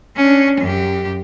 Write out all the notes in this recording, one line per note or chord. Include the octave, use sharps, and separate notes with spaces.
C#4 D4
F#2 G4